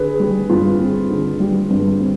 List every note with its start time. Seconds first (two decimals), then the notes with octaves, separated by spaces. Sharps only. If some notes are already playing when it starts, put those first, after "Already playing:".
Already playing: D3 G#4 B4
0.20 G3
0.50 G2 F4
0.80 C4
1.10 D3
1.40 G3
1.70 G2
2.00 C4